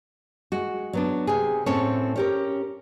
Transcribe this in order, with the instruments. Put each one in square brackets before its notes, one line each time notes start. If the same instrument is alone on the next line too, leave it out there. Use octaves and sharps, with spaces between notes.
[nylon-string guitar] G#3 F#4
F#3 B3 D4
C3 G#4
A2 C4 C#4 A4 C5 C#5
C#4 G4 A#4